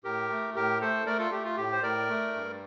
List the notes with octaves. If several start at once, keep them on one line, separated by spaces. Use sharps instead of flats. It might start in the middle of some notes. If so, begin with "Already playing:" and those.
A2 G4 A#4
A3
A2 G4 A#4
A3 A4 C5
A3 A#4 D5
F4 A4
A3 G4
F4
A2 G4
C5
A2 A#4 D5
A3
G2